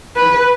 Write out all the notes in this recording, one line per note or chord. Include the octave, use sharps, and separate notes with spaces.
B4